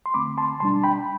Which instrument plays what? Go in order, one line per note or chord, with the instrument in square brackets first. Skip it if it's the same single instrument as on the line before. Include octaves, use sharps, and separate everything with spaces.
[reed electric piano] C6
E2 D3 A3 C4 B5 D6
A5 C6
B2 G3 D4 A5 C6
G5 B5